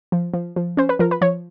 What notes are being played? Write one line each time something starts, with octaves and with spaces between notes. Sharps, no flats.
F3
F3
F3
C#4 C5
B4
F3 A#4
B4
F3 C#5